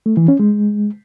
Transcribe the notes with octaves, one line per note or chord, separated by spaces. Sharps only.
A3
E3
C#4
G#3